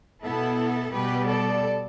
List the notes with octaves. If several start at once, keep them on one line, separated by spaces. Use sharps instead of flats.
B2 B3 E4 A4
B2 G3 B3 G4 B4
A4 D5